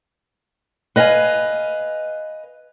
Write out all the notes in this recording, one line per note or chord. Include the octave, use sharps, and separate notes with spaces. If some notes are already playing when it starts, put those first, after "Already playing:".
B4 D#5 F5 F#5 G#5